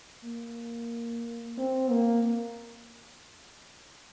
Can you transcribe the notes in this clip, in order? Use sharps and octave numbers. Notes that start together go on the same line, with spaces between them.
A#3
C4
A#3